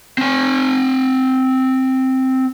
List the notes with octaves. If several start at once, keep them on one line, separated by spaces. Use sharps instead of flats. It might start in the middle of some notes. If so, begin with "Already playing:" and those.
C4 G#5